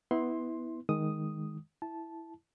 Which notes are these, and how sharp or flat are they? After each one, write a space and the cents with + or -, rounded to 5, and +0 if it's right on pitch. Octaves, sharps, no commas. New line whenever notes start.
B3 +0 E4 -20 C6 +10
D#3 +5 G#3 +0 D#6 +0
E4 +0 A5 -10